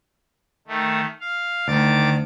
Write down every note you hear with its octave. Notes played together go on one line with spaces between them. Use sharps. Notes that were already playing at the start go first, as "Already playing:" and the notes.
D#3 A3
F5
D2 D#3 D6 A6